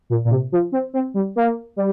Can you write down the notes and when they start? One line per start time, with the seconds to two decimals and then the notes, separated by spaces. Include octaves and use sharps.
0.10 A#2
0.25 A#2
0.30 C3
0.52 F3
0.72 C4
0.94 C4
1.14 G3
1.36 A#3
1.76 G3